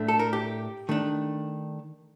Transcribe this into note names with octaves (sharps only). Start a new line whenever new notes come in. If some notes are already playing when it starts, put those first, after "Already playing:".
Already playing: A2 A3 D4
A4
A#4
G4
D#3 A3 D4